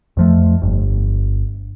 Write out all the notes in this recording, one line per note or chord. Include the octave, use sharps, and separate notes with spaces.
F2 F3 A3
G1